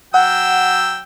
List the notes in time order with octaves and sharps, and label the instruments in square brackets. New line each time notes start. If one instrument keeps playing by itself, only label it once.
[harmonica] F#3 G5 E6 [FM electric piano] F#5